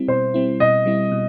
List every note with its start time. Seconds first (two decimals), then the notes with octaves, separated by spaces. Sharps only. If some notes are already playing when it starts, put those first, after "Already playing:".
Already playing: G3 C4 E4
0.08 B2 C5
0.34 G3 C4 E4
0.60 B2 D#5
0.86 G3 C4 E4
1.12 B2